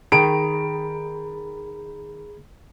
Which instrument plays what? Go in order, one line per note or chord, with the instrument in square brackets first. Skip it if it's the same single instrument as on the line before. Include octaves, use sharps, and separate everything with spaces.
[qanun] D#3 [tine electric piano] G#4 A#5 B5 [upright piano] D7